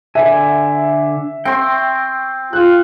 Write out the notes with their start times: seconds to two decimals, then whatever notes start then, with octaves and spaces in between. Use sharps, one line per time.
0.15 D3 E5 G#5
1.45 C4 G5 C6 C#6
2.53 F4 F#6